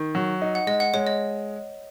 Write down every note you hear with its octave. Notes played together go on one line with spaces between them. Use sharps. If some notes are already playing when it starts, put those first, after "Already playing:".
Already playing: D#3
F#3
D#4
F#5
G#3 D#5
F#5
G#3 C#5
D#5